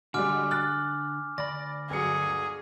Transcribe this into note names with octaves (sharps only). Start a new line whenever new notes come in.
D3 G3 G#3 F#4 G#5 D6 F6
F6 F#6 A6
D2 D5 B5 A#6
G1 F#3 G#4 C#7